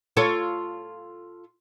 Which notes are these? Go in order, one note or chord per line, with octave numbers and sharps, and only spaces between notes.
F4 A4 C#5